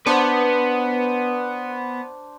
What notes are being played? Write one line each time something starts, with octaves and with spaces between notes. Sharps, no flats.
B3 D4 B4 C5 F#5